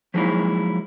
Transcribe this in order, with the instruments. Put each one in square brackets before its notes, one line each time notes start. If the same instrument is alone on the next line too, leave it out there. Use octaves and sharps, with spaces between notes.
[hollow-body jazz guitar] F3 F#3 G#3 A#3 D#4 E4